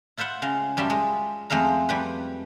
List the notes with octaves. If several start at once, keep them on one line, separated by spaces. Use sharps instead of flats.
E4 F4 C5 E5 F#5
C#3 G#3 F5
F#2 G3 F4 E5 A5
G#3
F2 G#3 A3 F5 A#5
F2 G3 B4